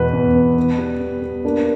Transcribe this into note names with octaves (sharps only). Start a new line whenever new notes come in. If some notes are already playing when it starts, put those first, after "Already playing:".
Already playing: E2 B2 B4
E2
B3
B3
G3
B3
B3
A#3 D4